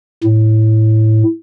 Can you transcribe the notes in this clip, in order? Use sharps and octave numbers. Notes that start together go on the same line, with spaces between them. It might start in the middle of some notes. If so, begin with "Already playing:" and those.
A2